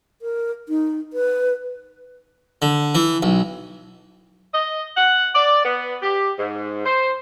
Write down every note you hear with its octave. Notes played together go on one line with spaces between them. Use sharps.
A#4
D#4
B4
D3
E3
B1
D#5
F#5
D5
B3
G4
G#2
C5